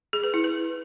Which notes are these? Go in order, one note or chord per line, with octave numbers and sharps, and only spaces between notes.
G#4
B4
E4
B4